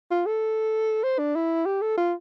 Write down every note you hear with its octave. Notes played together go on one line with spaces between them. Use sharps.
F4
A4
C5
D4
E4
G4
A4
F4